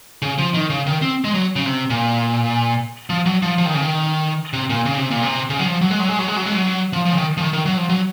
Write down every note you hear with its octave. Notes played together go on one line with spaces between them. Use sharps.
C#3
F3
D#3
C#3
D#3
C4
G#3
F#3
C#3
C3
A#2
F3
F#3
F3
F3
D#3
C#3
D#3
C3
A#2
C#3
C3
A#2
C3
C#3
F#3
F3
F#3
G#3
F#3
G#3
F#3
G#3
F#3
G#3
F#3
F3
F3
C#3
D#3
F3
D#3
D#3
F#3
F3
F#3